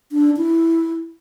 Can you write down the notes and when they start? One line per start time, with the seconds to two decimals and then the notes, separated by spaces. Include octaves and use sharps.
0.12 D4
0.37 E4